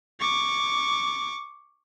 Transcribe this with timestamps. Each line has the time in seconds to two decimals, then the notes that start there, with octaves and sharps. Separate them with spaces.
0.20 C#6 D6